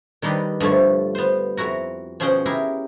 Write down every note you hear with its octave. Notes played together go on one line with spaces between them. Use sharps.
D#3 G3 D4 D#4 B4
G2 D3 F3 A3 C#5
B3 C5
F2 E4 F#4 A#5
B2 F3 C#4 G#4 F#5 G5
E4 G4 G#4 A#4